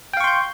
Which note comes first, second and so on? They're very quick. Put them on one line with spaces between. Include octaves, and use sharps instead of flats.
G5 F5 C#6 C6 G6